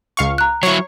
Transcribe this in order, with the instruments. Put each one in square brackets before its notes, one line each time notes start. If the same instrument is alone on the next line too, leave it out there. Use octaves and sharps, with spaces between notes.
[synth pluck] C#2 F5 C#6
[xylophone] A#5 F#6
[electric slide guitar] F#3 E4 [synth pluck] C#5 C#6 [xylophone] C7